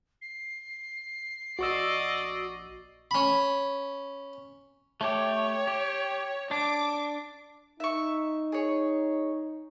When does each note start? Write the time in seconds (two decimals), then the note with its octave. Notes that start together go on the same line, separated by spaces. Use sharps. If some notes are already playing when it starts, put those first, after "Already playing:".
0.22 C7
1.59 A#1 F#4 D5 D#5 C#6 E6
3.11 C#4 B5
5.01 A3 G4 C#5
5.67 G4
6.51 D4 D6
7.80 D#4 E5 C#6
8.52 G#4 C#5